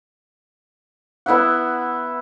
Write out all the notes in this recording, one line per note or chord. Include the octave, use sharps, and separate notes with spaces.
B3 E4 E5 F#5